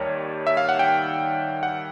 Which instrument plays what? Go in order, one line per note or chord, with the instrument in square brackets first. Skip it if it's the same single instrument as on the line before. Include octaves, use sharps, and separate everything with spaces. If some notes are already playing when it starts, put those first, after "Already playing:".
Already playing: [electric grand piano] D#2 D#3 G3 C#5
E5
F5
F#5
G5
F#5